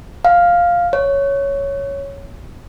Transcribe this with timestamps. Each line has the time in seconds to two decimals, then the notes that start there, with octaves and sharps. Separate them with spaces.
0.25 F5
0.93 C#5